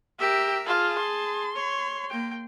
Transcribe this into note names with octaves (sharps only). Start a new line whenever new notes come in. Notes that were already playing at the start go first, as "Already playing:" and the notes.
G4 A#4 E5
F4 G#4 A5
C6
C#5
A#3 G5